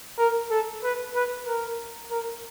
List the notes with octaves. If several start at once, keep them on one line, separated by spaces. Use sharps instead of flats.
A#4
A4
B4
B4
A#4
A#4